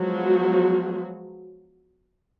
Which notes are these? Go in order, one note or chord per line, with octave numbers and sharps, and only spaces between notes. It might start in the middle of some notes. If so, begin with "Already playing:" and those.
Already playing: F3 F#3 G#3 B3 F#4